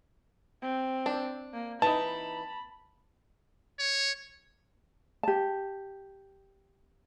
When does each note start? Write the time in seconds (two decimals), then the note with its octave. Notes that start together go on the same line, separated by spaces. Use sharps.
0.62 C4
1.06 D4
1.53 A#3
1.82 E3 D#4 A5 B5
3.79 C#5
5.23 G4 A5